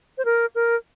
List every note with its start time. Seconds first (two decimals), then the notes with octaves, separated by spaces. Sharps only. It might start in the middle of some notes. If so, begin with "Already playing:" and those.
0.18 C5
0.25 A#4
0.55 A#4